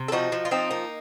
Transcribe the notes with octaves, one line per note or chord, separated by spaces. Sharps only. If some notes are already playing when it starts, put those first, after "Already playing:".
Already playing: C3
A4
F3 D#4 F#4
F3
F4
F3 C4 D#4
A#3